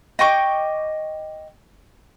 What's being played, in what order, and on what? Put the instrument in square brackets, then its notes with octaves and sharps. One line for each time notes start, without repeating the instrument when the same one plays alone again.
[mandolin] D#5 G5 C#6 D6